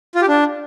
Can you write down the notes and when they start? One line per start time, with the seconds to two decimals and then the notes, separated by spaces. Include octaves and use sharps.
0.15 F4
0.22 G4
0.28 D4